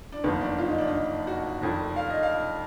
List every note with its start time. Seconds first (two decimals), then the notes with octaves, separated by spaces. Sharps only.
0.12 D4
0.24 F#1 F2 D#3 B3
0.41 D4
0.58 F4
0.68 D#4
0.78 D4
0.88 D#4
1.27 F#4
1.61 F1 F2 D#3
1.96 F5
2.09 D#5
2.23 F5